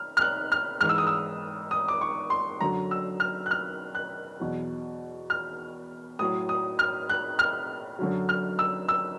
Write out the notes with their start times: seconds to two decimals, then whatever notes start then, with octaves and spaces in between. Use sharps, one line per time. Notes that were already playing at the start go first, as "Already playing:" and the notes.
Already playing: F6
0.17 F6
0.21 F#6
0.52 F6
0.81 G#2 E3 F6
0.89 E6
0.98 D#6
1.07 E6
1.71 D#6
1.88 D6
2.01 C#6
2.30 C6
2.61 F#2 D3 F#3 A#5
2.91 E6
3.20 F6
3.46 F#6
3.51 F6
3.95 F#6
4.40 E2 B2 F#3
5.30 F6
6.19 A2 F#3 D#6
6.49 D#6
6.79 F6
7.10 F#6
7.39 F6
7.99 F#2 D3 F#3
8.29 F6
8.59 E6
8.89 E6